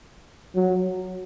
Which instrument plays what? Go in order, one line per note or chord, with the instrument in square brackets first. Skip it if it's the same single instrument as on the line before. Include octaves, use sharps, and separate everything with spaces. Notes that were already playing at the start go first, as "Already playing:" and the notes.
[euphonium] F#3